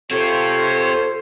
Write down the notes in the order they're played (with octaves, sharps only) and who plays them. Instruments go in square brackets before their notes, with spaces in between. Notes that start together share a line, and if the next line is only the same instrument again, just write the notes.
[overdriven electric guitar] C4 G4 [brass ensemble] F4 C5 [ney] A4 [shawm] C#5